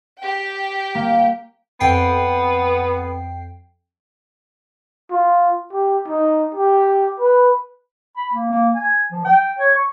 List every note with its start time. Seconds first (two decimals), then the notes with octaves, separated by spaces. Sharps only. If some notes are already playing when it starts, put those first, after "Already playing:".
0.19 G4 G5
0.95 A#3
1.80 F2 B3 G5 C7
5.11 F4
5.73 G4
6.08 D#4
6.55 G4
7.20 B4
8.17 B5
8.33 A#3
8.50 A#3
8.75 G#5
9.12 F3
9.25 G5
9.59 C#5
9.75 C#6